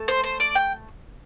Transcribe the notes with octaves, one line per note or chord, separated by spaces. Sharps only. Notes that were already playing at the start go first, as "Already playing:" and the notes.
Already playing: A3 A4
C5
C5
D5
G5